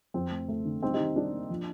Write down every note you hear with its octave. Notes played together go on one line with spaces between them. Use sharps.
F2 C4
A3
A3
D3
G3 C4 D#4
D#4 G4
D#3
G3 D4
A#3
F3